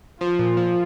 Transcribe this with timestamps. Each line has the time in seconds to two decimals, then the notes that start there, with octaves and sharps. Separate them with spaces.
0.21 F3 F4
0.39 A#2
0.57 F3